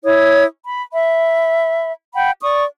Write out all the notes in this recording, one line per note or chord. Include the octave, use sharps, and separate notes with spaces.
E4 C#5 D#6
B5
E5 B5
F#5 G5 B5
D5 C#6 D#6